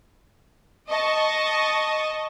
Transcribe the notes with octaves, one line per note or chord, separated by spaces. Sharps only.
D#5 A5 C#6